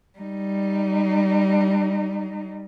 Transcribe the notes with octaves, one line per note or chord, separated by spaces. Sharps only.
G3 D#4